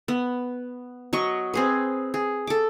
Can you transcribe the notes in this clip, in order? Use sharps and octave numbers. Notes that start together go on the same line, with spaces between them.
B3
F#3 D#5 C#6
C4 G#4 B4
G#4
A4 D6